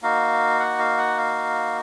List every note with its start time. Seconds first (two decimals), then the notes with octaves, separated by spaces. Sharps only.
0.02 A#3 D#4 F#4 F5
0.59 F#5
0.79 F5
0.98 F#5
1.17 F5